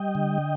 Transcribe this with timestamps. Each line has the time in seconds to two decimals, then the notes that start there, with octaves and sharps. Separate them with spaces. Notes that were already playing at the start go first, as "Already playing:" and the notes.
Already playing: G3 D#5 G5
0.15 D3